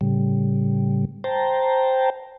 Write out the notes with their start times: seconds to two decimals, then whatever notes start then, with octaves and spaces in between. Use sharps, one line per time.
0.01 A2 C#3 G3
1.24 C5 G5 A5 A#5